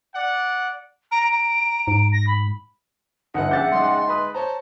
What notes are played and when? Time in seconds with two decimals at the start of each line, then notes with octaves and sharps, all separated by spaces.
0.14 D5 F#5
1.11 A#5 D7
1.32 A#5
1.88 G#2 D7
2.12 A#6
2.27 B5
3.34 G1 D#4 E4 B4 F#5
3.51 A#1 C#3 E5 F#5 G6 A6
3.72 G#3 D#4 C6
4.08 B4 B5 D#6
4.34 C5 C#5 A5 A#5